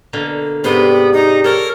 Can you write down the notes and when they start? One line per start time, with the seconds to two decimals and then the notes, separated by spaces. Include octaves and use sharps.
0.13 B2 D3 A#3
0.64 G#2 C3 B3 G4 D5 C6
1.13 D#4
1.44 A4 A#4 C#5